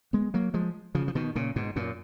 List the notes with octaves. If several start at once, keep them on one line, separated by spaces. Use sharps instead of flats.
G#3 B3
F#3 A#3
F3 G#3
C#3 F3
F3
B2 D#3
A#2 C#3
G#2 B2
F#2 A#2